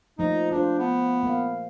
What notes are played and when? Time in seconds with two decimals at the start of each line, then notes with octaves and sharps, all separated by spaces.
0.19 F3 A3 A#3 D#4
0.51 D4 F4 C5
0.79 B3
1.23 A#3 F5